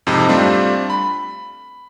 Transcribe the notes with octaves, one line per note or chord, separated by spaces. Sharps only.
F2 G#2 C3 D#4
G3 A3 C4 D4 F4
B5